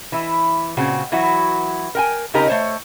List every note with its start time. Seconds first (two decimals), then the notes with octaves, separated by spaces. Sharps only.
0.12 E3 E4
0.77 A#2 C#3 C4 F#4
1.12 E3 F#3 E4 F#4
1.95 A#4 G5 G#5
2.34 C#3 C4 D#4 G4 A#4 A#5
2.48 A3 C5 C#5